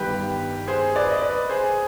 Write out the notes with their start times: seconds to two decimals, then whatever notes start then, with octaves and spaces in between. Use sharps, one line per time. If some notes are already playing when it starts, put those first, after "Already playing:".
Already playing: G1 G2 D#3 B3 G4 B4
0.68 G#4 C5
0.95 B4 D5
1.11 D#5
1.22 B4 D5
1.49 G#4 C5